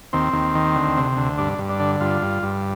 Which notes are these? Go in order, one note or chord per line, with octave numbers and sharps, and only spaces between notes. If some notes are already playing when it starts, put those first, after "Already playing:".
D#2 C4
D#2
D#3
D2
C3
D2
G2 D4
G2
D4
D3
G2 F4
G2
G2